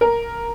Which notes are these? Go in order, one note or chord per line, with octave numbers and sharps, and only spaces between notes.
A#4